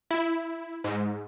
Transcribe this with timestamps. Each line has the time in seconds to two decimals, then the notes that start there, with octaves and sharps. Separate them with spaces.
0.11 E4
0.84 G#2